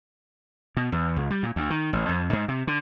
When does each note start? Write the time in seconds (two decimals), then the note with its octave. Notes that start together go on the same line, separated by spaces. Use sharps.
0.77 B2
0.92 E2
1.16 C#2
1.30 G3
1.43 A#2
1.56 D2
1.70 D#3
1.93 A1
2.09 F2
2.33 G#2
2.48 C3
2.67 D3